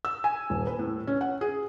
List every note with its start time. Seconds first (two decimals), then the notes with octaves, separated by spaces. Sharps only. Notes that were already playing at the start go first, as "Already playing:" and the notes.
0.05 E6
0.24 G#5
0.50 D#1
0.67 B4
0.79 A2
1.07 C#4
1.21 F#5
1.41 G#4